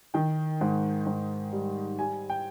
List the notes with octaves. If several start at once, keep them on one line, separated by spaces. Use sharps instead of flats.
D#3 G5
G#2
G#2
G3
G3 G#5
G5